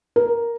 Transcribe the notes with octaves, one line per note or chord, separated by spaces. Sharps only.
A#4